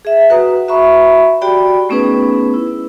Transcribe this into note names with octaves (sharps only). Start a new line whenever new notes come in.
G#4 E5
F#4 B4 F#5 A#5 D#6
F#4 E5 A#5 B5 C#6
F#4 G4 D5 G5 B5
A3 B3 C#4 D#4 G#4 B4
E4